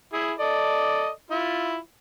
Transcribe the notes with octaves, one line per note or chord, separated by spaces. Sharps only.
E4 G#4
A4 D5 D#5
E4 F4